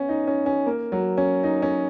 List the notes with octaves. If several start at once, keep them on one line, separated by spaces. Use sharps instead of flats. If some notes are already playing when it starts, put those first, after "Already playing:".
Already playing: B3 C#4
D#4
C#4
C#4
A#3
F#3
C#4
D#4
C#4